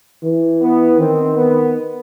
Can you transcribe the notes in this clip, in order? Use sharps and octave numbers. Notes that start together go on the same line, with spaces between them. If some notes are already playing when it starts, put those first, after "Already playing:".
E3
B3
D#3 C4
B3